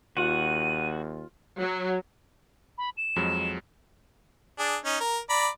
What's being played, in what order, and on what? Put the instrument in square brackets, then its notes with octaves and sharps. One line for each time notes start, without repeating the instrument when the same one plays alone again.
[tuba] D#2 [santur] F4 [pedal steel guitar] F#4 F#5 [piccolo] D#7
[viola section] F#3
[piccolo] B5
E7
[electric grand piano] F2 F#3 G#3
[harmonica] D4 G#4
C#4 D#4
A#4
D5 A#5 B5